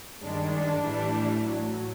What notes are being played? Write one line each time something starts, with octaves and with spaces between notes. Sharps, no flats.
G2 D#3 G#3 D4
D4
A2 E3 G3
A2 F#3